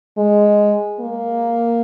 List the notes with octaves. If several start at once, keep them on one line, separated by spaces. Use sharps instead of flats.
G#3
A#3